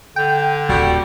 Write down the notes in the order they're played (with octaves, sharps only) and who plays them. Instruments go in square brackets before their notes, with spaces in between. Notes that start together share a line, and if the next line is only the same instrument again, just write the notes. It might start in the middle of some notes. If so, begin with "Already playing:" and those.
[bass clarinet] D3 [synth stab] G5
[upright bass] D#1 [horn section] G3 F#4 G4